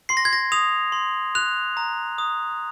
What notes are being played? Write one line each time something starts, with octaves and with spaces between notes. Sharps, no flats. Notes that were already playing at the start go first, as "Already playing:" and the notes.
C6 C7
A#6
G#6
A#6
D#6 F7
C6
F#6 F7
A#5
D#6